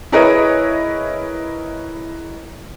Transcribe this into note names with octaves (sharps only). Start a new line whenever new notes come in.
E4 G#4 A#4 B4 C#5 D#5